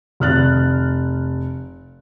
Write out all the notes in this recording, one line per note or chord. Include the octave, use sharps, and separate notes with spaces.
F1 F6 F#6 A6